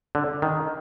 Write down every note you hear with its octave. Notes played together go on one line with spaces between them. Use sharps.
D3
D#3